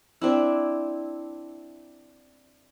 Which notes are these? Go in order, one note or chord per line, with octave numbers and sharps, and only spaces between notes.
C4 D4 E4